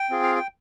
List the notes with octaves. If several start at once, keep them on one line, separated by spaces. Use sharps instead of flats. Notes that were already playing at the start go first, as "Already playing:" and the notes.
Already playing: G5
C4 F4 G#4
F5
G5